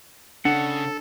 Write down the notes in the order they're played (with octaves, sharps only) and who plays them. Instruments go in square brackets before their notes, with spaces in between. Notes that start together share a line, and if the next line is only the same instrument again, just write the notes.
[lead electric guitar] C#3 [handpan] D4 [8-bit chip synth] A4 [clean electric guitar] F#5